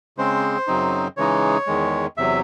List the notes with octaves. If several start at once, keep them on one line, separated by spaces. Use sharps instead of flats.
C#3 G#3 C4 C5
F#2 C#3 F#3 C4 D#4
C#3 E3 G#3 D#4 C#5
E2 D#3 G#3
E2 C3 F#3 E5